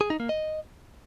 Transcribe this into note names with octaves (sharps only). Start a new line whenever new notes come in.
G#4
D#4
A#3
D#5